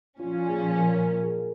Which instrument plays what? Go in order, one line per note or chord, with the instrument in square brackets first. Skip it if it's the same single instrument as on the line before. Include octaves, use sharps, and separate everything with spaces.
[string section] A#2 F3 C#4 [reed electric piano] F4
[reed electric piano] F4
G#4
A#4
A#4
A#4
G#4